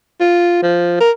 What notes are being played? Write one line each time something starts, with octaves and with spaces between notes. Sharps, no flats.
F4
F3
A#4